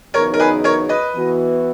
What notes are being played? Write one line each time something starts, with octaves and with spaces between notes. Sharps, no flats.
E2 C#3 F#3 B3 D#4 A#4 C#5
A#4
G#4 B4
A#4 C#5
B4 D#5
E3 B3 F#4